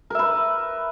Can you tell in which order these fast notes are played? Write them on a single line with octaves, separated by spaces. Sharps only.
A#4 E5 B4